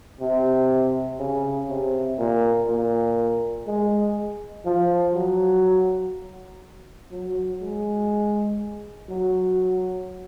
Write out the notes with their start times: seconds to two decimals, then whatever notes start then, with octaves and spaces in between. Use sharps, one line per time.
0.21 C3
1.20 C#3
1.70 C3
2.18 A#2
2.68 A#2
3.67 G#3
4.65 F3
5.14 F#3
7.11 F#3
7.61 G#3
9.09 F#3